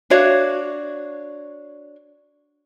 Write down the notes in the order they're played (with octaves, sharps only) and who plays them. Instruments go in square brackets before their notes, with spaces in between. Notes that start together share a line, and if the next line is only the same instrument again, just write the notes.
[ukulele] D4 F#4 C#5 F5